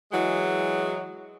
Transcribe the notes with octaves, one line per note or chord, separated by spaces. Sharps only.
E3 F#3 G#3